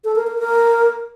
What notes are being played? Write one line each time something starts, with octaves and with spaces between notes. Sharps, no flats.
A4
A#4
A#4
A#4